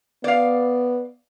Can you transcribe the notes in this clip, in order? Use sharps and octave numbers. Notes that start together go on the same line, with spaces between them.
B3 D5 F5